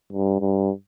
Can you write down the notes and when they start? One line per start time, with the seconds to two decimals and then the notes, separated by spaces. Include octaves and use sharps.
0.13 G2
0.41 G2